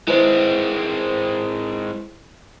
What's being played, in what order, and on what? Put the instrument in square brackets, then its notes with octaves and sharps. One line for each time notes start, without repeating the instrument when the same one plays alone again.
[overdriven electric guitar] G#3 C4 [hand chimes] E4 B4 C5